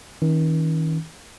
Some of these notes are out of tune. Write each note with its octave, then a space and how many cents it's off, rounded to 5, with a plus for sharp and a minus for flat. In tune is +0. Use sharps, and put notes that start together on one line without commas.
D#3 +40 C#4 +0